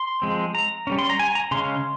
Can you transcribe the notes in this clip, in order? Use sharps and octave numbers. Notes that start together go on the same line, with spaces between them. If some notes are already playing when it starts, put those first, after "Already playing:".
Already playing: C6
F3 G#3 C4
A#5
G3 A#3 C#4
C6
A#5
G#5
A#5
C#3 G#3 C#4 C6